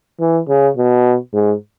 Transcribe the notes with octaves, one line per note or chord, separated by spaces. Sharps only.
E3
C#3
B2
G#2